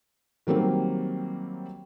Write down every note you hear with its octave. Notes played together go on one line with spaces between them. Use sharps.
D#3 F#3 G3 A#3 C4